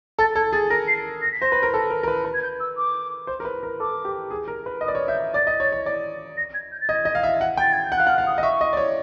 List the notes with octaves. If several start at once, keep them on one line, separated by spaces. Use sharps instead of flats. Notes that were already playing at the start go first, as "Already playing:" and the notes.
A4 A6
A4 G#6
G#4 A6
A#4 A#6
C7
A#6
B6
C5 A#6
B4
A#4
A4
A#4
A#4
B4
B4
G#6
G6
E6
D6
C5
A#4
B4
A#4
A4 D6
G4
G#4
A#4
B4
D#5 D#6
D5
C#5
E5 G6
D5 A6
D#5
C#5
C#5
D5
A#6
G#6
G6
A6
D#5 G#6
D#5
F5
E5
F#5
G5
A6
G#6
G6
F#5
F5 F#6
F#5 F6
F5
D#6
D#5
E5 C#6
D#5
D5
C#5